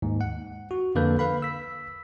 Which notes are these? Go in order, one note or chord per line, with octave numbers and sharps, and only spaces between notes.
D#2 G#2
F#5
F#4
F2 D3 A#3 A4 B4 G6
B4 F5 B5
E6 B6